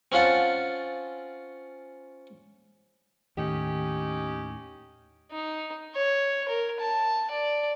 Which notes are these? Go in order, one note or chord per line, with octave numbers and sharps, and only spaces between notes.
C4 C#4 F4 F#5 A5
D#2 A2 D#3 C#4 D#4 G4
D#4
C#5
A#4
A5
D5